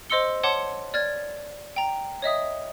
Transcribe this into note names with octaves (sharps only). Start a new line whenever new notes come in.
C5 D#5 C6 E6 C#7 G7
C#5 F#5 A5 C6 D6 C#7
D5 F6 G#6 A6
G5 A#5
C#5 D#5 E5 D#6